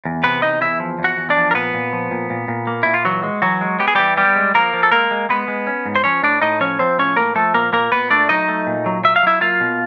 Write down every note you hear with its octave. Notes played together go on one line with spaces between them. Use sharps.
E2
C3 B3 B4
E2 D#4 D#5
E2 E4 E5
F3
E2
F#4 F#5
E2
D4 D5
F3
A#4
A#2 B3 B4
A#2
F3
A#2
A#2
A#2
A#3
A#2 E4
F4
E3 F#3 F#4
G#3
E3 F#3 F#4
G#3
B3 G4
G#4
E3 G3 G4
G3 B3 G4
G#3
F3 A#3 A#4
F3
A4
G#3 A#3 A#4
G#3
G#3 B3 B4
G#3
C#4
G#2
C5
F3 C#4 C#5
A2 D4 D5
A2 D#4 D#5
F3 C#4 C#5
F3 C4 C5
A2 C#4 C#5
A2 A#3 A#4
F3 A3 A4
A#2 A#3 A#4
A#2 A#3 A#4
A#2 B3 B4
A3 D4 D5
F#3 D#4 D#5
A3
A#2
F#3
F#3 E5
F5
F#3 E4 E5
A#3 F4 F5
B2